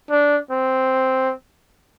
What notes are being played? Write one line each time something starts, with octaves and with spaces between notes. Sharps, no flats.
D4
C4